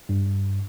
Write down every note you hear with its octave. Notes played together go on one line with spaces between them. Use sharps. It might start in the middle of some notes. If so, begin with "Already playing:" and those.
G2